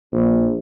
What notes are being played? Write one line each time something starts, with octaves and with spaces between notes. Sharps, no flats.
A#1